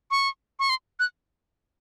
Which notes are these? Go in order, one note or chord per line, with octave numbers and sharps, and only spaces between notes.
C#6
C#6
C6
F#6